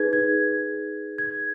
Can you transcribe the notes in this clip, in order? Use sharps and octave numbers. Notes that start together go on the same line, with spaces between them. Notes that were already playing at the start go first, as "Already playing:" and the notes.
Already playing: D#4 G#4 B4 G#6
G#6
G#6